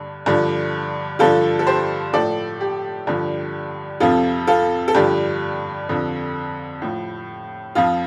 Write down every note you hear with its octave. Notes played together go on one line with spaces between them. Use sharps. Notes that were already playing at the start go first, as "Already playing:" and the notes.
Already playing: G2 D3
G2 D3 F3
G2 D3 F3 F4 A4
A4
G4 C5
A2 F3 A4 D5
G4
G2 D3 F3
F2 C3 F3 F4 A4
F4 A4
A4
G2 D3 F3 G4
F2 D3 F3
A2 F3
F2 F3 F4